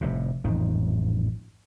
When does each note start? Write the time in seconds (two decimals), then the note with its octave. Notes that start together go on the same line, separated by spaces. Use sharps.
0.01 F1 A2 C3
0.44 A1 F2 G#2 D#3